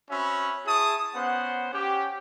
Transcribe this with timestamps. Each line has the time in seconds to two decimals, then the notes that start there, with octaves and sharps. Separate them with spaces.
0.10 C4 C#4 F#4 E5 B5
0.66 E4 G#4 A5 C#6 D#6
1.14 B3 C#4 C5 F#5
1.73 C#4 G4